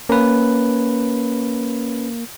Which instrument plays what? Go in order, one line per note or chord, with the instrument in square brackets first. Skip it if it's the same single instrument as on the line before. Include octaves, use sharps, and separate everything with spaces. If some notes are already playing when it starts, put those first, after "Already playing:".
[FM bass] A#3 [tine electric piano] C#4 B4